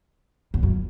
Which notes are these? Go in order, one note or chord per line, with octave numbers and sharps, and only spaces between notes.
E2
F#2